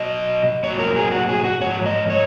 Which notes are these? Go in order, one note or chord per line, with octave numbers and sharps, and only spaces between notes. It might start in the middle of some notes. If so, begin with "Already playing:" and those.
Already playing: B2 F#3 D#5
A#2 F#3 C#5
A#4
G#4
F#4
G#4
F#4
G#2 F3 C#5
D#5
C#5